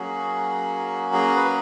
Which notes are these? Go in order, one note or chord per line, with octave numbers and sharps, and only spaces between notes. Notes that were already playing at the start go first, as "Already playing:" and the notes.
Already playing: F#3 A#3 C#4 F#4 G#4
G#4
B4